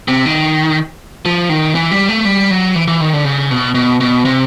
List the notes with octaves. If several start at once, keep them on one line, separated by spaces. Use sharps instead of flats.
C3
D#3
F3
D#3
E3
G3
A3
G3
F#3
E3
E3
D#3
D3
C#3
B2
B2
B2
C3